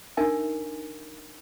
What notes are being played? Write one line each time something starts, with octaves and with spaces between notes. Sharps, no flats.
D4 D#4 A#4 E5 G#5